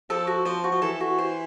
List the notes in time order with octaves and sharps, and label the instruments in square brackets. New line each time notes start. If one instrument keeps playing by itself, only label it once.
[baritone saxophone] F3 [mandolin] A4
[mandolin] F#4
[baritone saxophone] F3 [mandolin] C5
[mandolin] F#4
[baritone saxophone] F3
[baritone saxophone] E3 [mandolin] A4
[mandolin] F#4
C5